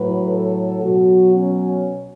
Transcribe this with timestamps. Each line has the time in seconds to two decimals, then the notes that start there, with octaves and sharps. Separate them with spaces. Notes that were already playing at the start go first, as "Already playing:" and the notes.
Already playing: A2 F#3 B4
0.27 A4
0.80 B2 F#3 F#4
1.34 C#4